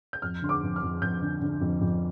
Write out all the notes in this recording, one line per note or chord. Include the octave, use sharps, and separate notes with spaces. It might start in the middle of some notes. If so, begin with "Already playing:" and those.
G6
F2 F6
D3 C6
D6
F2
F6
F2
F2 G6
D3
D3
F2
F2